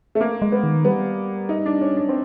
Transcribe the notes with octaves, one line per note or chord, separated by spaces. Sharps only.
A3
A#3
G#3
B3
D#3
G3 B3
D#4
D4
C#4
D4
C4